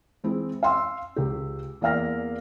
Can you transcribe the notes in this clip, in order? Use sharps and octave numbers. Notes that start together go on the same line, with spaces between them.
E3 G#3 C4 E4
F5 C6 E6
C#2 G4
E2 A#3 D5 F5 F6 A#6